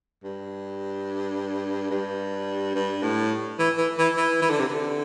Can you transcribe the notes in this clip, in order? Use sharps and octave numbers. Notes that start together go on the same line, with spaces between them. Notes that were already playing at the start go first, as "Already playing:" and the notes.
G2
G2
G2
A2
E3
E3
E3
E3
E3
D3
C3
D3